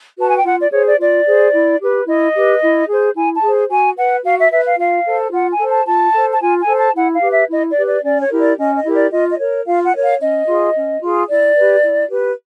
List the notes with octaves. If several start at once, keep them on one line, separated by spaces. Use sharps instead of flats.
F#4 B4 A5
G#5
G5
F4 F#5
D5
G#4 C5 C#5
D5
F4 D5
G#4 C5
E4
G4 B4
E4 D#5
G4 B4
E4
G#4 C5
E4 G#5
A5
G#4
C5
F#4 G#5
B4 F#5
F#4 F5
E5
B4 E5
F5
F4 F5
A4 C5
F4 F#5
G#5
A4 C5
A5
F4 A5
A4 C5
A5
F4 G#5
G#5
A4 C5
A5
E4 F#5
F5
G4 B4
E5
E4 D#5
D5
G4 B4
D5
C#4 D5
C#5
E4 G4 A#4
D5
C#4 D#5
D#5
E4 G4 A#4
D5
F4 D#5
D#5
A#4 C#5
F4 F5
F#5
A#4 C#5
F5
C#4 D#5
F4 G#4
C#4
F4 G#4
E4 D5
G4 B4
E4
G4 B4